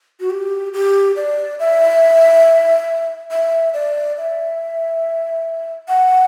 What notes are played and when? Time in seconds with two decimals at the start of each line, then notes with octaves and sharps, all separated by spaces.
0.20 F#4
0.30 G4
0.73 G4
1.16 D5
1.59 E5
3.31 E5
3.74 D5
4.17 E5
5.88 F#5